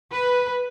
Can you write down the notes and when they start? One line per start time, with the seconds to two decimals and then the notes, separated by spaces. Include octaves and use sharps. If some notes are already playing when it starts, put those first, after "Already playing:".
0.12 B4